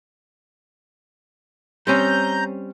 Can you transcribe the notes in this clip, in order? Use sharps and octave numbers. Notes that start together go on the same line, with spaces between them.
G3 C4 C#4 A#5 G6